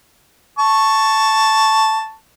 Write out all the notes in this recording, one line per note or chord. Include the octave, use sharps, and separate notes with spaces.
A5 C#6